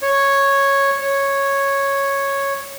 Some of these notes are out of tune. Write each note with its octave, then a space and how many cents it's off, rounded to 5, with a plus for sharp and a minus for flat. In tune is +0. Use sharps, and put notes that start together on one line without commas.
C#5 -5
C#5 -5